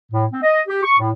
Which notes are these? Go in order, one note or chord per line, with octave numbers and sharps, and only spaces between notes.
A2
C4
D#5
G4
C#6
A2